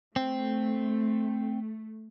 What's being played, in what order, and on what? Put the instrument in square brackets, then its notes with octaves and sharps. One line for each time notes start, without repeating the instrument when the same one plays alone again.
[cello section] A3 [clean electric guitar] C4